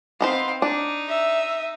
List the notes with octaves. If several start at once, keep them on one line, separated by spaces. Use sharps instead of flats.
B3 C4 D#4 C5 F5
D4 D#4
E5